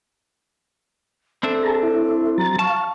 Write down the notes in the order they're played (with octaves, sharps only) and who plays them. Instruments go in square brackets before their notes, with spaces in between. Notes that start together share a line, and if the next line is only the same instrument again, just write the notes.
[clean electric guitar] C4 D4 E5 [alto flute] A4
[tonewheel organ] G#4 A5 A#5
E4
[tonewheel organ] F#3 A6 [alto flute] A#5
[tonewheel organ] F5 [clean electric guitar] A5 [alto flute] C#6